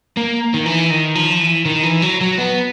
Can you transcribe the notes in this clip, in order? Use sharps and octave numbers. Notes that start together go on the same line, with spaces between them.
A#3
D#3
E3
D#3
F3
E3
D#3
E3
F#3
F#3
B3